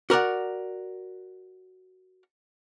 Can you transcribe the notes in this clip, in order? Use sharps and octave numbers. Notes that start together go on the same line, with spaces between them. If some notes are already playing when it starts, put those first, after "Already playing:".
F#4 A#4 D5 F#5